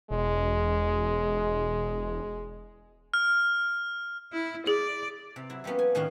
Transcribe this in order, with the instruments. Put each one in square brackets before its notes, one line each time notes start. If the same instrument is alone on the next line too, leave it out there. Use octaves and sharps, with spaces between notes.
[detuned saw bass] E1 [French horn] G#3
[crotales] F6
[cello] E4
[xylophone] G#4 [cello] D5
[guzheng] C3
F#3 E4
F3 G3 A#3 B3 C#4
G#5
A2 D#3 C#4 D4 F5 G#5